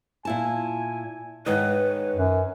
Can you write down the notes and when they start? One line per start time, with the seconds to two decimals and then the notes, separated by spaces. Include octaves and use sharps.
0.25 A#2 E4 G#5 A5
1.46 G#2 D#3 B4 C#5 D#5
2.15 F#2